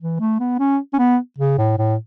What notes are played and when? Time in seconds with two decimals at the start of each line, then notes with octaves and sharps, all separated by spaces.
0.01 E3
0.20 A3
0.40 B3
0.59 C#4
0.93 C#4
0.99 B3
1.38 C#3
1.58 A2
1.78 A2